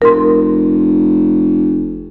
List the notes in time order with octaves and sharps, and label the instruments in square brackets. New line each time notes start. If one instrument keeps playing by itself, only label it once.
[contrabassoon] F1 [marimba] A#4 C6